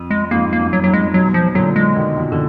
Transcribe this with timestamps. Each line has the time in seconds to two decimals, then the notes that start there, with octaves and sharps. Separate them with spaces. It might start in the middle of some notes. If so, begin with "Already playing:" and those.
Already playing: F2
0.11 G#3
0.31 F2 G#2 A#3
0.53 A#3
0.59 F#2
0.73 F#3
0.84 F2 G#2 F#3
0.94 G#3
1.14 G#2 B2 F#3
1.34 F3
1.55 A#2 D3 F#3
1.76 G#3
1.96 B2 D#3
2.16 B2 D#3
2.32 D3